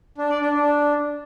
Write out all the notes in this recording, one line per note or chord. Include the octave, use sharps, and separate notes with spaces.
D4
D5
D4
D4